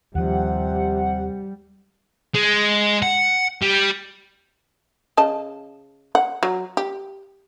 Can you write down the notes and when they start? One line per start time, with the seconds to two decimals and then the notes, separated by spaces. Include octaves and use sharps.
0.15 D#2 C3 F3 G3 F#5
2.34 G#3
3.02 F#5
3.62 G3
5.17 C#3 D#5 A5
6.15 F#5
6.43 F#3
6.77 G4